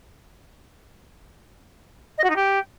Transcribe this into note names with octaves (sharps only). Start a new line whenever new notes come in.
D#5
F#4
D#4
G4